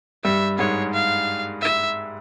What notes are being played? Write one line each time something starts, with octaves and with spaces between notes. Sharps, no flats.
G2 G3 E5
G#2 G#3 C#5
F5
E5